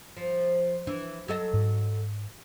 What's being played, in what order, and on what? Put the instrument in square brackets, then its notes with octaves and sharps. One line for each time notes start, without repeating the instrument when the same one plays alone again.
[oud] F3
[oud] E3 [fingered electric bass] D4
[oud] F#3 A4 D#5
[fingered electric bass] G#2